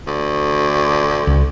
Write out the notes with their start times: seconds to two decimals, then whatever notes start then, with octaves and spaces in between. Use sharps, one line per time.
0.07 D2
1.27 C#2